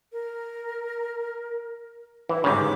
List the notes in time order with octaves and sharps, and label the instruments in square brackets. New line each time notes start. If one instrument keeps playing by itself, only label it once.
[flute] A#4
[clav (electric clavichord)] E3 [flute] E4
[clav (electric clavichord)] G1 G#2 C#3 [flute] D6